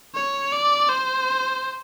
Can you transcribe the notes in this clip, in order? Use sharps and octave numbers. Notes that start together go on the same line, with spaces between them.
C#5
D5
C5